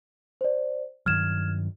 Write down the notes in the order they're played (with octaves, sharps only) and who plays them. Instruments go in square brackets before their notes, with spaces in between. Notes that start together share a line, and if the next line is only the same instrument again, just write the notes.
[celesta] C5 D5
[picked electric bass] G2 D#3 F#3 [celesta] F6 G#6 E7